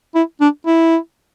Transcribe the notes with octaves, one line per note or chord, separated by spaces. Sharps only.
E4
D4
E4